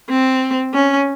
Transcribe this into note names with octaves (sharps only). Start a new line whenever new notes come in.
C4
C#4